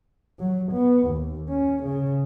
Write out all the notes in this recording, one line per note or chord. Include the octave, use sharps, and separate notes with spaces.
F#3
B3
D#2
C#4
C#3